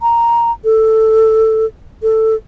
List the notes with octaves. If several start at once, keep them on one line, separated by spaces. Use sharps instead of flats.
A#5
A4
A4